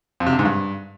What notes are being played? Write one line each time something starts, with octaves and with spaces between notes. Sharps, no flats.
F2
C3
D3
G#2
G2